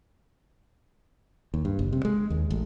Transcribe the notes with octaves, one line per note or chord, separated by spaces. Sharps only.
D#2
G2
F#1
C3
G#3
D#2
A1